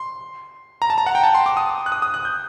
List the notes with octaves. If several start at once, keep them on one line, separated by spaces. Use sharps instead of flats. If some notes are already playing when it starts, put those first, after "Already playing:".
Already playing: C6
A#5
A5
A#5
F#5
G5
A5
C6
D6
D#6
F#6
D#6
D#6
F#6
G6